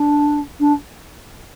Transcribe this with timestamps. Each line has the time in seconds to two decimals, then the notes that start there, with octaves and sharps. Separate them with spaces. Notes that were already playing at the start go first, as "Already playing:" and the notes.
Already playing: D4
0.60 D4